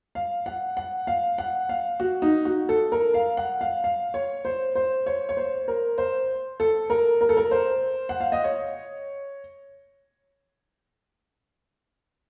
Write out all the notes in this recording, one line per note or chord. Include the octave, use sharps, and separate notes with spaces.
F5
F#5
F#5
F5
F#5
F5
F#4
D#4
F#4
A4
A#4
F5
F#5
F5
F5
C#5
C5
C5
C#5
C#5
C5
A#4
C5
A4
A#4
A#4
A4
A#4
C5
F#5
F5
D#5
C#5